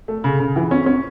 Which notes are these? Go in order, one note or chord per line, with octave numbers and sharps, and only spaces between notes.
A3
C#3
C#3
E3
C#4
C#4